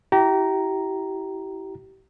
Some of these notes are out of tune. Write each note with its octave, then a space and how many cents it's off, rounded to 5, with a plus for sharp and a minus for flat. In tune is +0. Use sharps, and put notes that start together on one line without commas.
E4 +0 G4 -30 A#5 +0